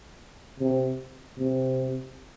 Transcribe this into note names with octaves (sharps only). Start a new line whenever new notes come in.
C3
C3